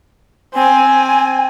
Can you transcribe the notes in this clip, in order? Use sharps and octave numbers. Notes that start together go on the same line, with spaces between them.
C4 G#5